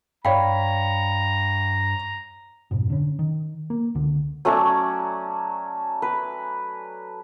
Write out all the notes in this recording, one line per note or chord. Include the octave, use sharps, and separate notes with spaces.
G2 C#5 D5 F5 G5 A#5 B5
F2 G#2 B2
D3 C#4
D#3
A#3
C#2 D3
F#3 A3 C#4 D5
B4